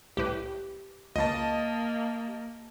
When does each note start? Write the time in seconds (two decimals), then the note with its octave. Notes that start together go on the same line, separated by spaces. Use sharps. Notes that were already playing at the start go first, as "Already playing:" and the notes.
0.17 C2 A2 G4 B4
1.16 C#2 C#3 A#3 D#5 A5